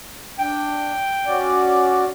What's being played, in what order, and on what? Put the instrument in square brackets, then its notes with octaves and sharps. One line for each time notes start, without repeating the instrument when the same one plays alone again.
[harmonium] D4 [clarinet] G5
[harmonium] C#4 F#4 D5